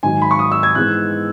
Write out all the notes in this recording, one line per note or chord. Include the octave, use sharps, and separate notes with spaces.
G#2 D#3 F#3 G#5
B5
C#6
D#6
E6
G#6
G#2 E3 G#3 B3 F#6